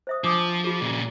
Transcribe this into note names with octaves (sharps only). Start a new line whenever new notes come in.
C5 E5 D#6
F3 D4 D6 D#6
F4 F#4 G#4
A#2 C#3